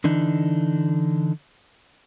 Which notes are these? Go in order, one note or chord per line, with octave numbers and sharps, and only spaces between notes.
D3 E3 D4 D#4